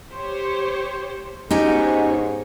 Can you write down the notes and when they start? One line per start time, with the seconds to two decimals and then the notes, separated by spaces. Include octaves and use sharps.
0.12 G4 C5 C#5
1.51 G#2 B3 C#4 D#4 F#4 G4 C#5 G#5